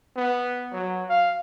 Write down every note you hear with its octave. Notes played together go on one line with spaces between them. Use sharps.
B3
F#3
F5